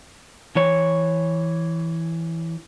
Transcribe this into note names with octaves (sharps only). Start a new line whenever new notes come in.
E3 C#5